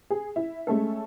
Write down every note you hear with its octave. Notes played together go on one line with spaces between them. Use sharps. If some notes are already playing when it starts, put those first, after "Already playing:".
G#4
E4
G#3 A3 C#4 A4